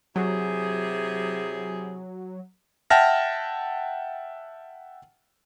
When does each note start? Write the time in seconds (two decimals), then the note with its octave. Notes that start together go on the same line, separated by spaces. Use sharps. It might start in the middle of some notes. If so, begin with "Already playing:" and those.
0.16 C3 F#3 E4 G#4
2.90 E5 F#5 G5 A5 F6 A#6